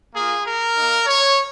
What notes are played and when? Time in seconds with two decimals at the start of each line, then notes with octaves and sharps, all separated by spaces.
0.14 A#3 F4 G#4
0.45 A#4
0.76 A#3 D#4
1.06 C#5